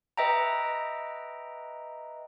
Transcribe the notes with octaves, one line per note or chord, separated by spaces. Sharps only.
B4 D#5 E5 G5 A#5